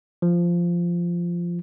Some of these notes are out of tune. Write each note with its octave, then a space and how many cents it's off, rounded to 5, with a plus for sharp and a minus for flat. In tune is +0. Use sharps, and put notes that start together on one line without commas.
F3 -10